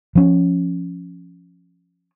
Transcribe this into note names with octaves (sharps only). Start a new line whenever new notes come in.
F3 C#4